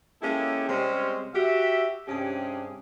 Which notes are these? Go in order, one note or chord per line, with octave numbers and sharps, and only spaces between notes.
G#3 A#3 C#4 E4 G4 A4
C3 G3 G#3 C4 C#4 C5
F#4 G4 E5
G2 C3 C#4 G4 G#4